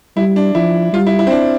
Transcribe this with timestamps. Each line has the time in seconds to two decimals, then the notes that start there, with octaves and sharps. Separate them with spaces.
0.17 G3 E4
0.36 D4
0.55 F3 E4
0.93 G3 F4
1.07 E4
1.19 E4
1.27 C4
1.31 D4